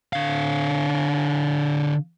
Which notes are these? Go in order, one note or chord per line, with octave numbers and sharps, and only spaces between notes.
D3 F5